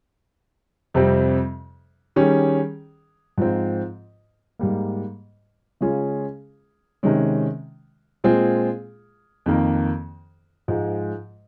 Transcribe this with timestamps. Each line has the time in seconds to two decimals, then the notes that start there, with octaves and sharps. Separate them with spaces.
0.94 F2 C3 G3 C4
2.16 D#3 G3 C#4 G#4
3.38 G#2 F3 C4
4.59 G#2 G3 A#3
5.81 C#3 G#3 C#4 F4 G#4
7.03 C3 D#3 G#3 C#4
8.24 A#2 G#3 C4 F4 G#4
9.46 F2 D#3 A#3
10.68 G#2 F3 G#3